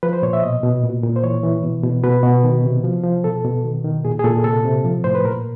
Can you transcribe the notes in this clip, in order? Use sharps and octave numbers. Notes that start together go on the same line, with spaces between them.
F3 B4
C5
A#2 C#5
E5
B2 D#5
B2
A#2
A#2
C5
E3 C#5
E3
B2
B2
B2 B4
B2
D#3
C3
F3
F3
B2 A4
B2
D#3
D#3
A#2 G#4
G#4
A#2 A4
C3 A4
C3
F3
A2 C5
B4
A#2 A#4